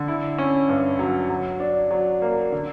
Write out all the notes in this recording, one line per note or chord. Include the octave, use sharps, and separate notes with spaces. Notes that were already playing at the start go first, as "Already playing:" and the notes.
Already playing: D3
E4
C#4
G2
F#3
F#3
D4
F#3
A#3
D3